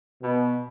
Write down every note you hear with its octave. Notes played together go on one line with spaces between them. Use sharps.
B2